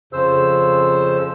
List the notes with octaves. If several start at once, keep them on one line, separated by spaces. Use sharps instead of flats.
F2 C#3 C5 E6